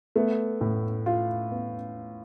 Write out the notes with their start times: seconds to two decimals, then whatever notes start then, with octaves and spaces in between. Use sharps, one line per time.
0.16 A3 B3
0.61 A2
1.06 F4
1.51 B3